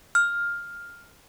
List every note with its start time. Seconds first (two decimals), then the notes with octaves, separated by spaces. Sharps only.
0.15 F6